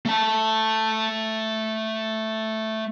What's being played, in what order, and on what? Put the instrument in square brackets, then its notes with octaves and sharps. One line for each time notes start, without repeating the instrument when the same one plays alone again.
[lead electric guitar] A3 A5